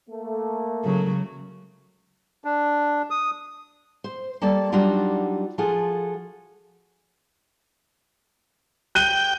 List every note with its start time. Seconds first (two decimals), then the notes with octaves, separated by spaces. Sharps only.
0.10 A3 A#3
0.84 C#3 F#3
2.45 D4
3.10 D#6
4.04 C5
4.42 G3 A#3 A4 D5 A5
4.72 F#3 G3 D4 D#4 F4 F#4
5.58 F3 F4 F#4 G#4 A4
8.95 G5 F#6 D#7 G7